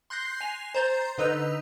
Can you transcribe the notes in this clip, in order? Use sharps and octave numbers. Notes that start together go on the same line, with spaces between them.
C6 F#6 G6 A#6 C7
G#5 C7 F7
C5 A#5 C6 G6 A6
D3 D#4 B4 D#5 E6 F7